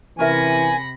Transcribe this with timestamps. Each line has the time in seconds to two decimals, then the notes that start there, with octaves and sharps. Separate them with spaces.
0.19 C3 E3 C#4 A#4 E5 G#5 B5 A#6